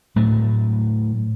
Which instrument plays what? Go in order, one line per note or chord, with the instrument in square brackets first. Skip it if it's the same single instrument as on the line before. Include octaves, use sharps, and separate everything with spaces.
[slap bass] A2 F#3 A3